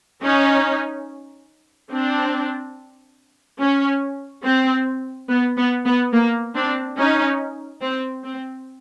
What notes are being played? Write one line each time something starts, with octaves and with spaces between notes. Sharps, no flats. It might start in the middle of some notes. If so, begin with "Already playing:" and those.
C#4 D#4
C4 D4
C#4
C4
B3
B3
B3
A#3
C4 D4
C#4 D#4
C4
C4